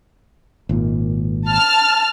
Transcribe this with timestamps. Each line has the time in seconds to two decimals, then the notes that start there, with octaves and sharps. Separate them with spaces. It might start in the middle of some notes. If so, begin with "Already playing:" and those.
0.69 G#1 A#2
1.49 A5 F6